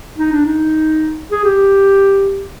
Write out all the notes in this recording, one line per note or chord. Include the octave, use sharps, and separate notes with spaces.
D#4
D4
D#4
G#4
G4